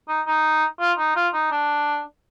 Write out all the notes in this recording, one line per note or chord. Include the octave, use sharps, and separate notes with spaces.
D#4
D#4
F4
D#4
F4
D#4
D4